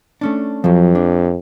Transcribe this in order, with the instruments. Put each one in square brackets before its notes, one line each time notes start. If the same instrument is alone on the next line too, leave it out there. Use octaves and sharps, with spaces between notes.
[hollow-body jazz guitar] A3 C#4 D4
[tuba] F2 [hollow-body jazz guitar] F3 F#3
[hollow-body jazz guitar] D4